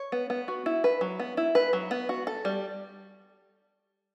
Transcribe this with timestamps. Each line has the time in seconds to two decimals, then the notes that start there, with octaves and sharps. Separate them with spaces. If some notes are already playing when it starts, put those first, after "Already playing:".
Already playing: C#5
0.12 B3
0.30 B3
0.48 F#4
0.66 E4
0.84 B4
1.01 F#3
1.19 B3
1.37 E4
1.55 B4
1.73 F#3
1.91 B3
2.09 F#4
2.27 A4
2.45 G3